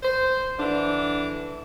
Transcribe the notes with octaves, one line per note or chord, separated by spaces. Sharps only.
C5
D3 E3 D4